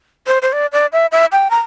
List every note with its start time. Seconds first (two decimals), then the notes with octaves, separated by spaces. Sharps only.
0.27 C5
0.42 C5
0.53 D5
0.73 D5
0.93 E5
1.12 E5
1.32 G5
1.50 A#5